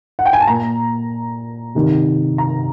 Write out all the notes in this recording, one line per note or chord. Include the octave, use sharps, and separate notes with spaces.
F#5
G5
G#5
A5
A#2 A#5
C3 D#3
A#5